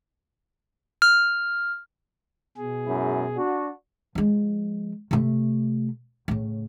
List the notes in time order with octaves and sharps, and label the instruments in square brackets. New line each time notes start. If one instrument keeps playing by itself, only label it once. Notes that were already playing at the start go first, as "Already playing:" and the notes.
[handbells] F6
[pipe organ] B2 G#4
[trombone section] F#2 G#3 E4
D4 F#4
[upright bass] F3 G#3
C3 A3
A2 C#3